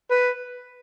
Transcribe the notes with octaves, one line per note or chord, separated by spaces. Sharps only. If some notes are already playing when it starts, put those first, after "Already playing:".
B4